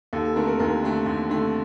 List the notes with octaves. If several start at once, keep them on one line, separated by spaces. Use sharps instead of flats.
D#2 A4
A4
D3 A3 C4 A#4
A#4
D#2 A#4
D3 A3 C4
D#2
D3 A3 C4